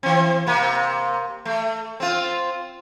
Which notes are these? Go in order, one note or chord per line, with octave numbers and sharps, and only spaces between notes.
E3 C4
C3 A#3
A3
C4 F4